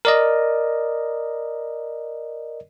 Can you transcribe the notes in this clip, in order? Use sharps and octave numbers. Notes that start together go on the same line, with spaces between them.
A#4 D5 D#5